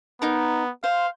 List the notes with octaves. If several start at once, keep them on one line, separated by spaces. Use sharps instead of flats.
B3 D#4 A#4
C5 F5